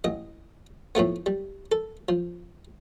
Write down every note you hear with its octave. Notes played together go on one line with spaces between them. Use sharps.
A1 D#5
A2 F3 A3 B3
G3
A4
F3